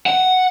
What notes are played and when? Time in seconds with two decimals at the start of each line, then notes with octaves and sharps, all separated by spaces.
0.06 F#5